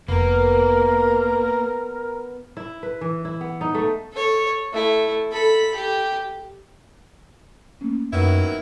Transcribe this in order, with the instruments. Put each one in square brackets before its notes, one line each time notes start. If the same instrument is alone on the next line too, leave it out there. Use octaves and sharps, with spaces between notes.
[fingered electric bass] F1 [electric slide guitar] A#3 [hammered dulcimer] B3 [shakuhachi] A#4
[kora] E4
B4
E3
E4
B3
D#4
A3
[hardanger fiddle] A4 C#5
A3 E4
A4 B5
G4
[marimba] A3 A#3 C#4
[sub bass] F#2 [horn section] D#3 F#3 B3 [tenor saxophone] E4